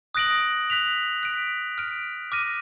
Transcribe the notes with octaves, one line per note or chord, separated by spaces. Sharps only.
D#6 F#6 A#6 D7 F#7
F#6 B6 F7
F#6 B6 D7
F6 B6 D7
D6 F6 A#6 D#7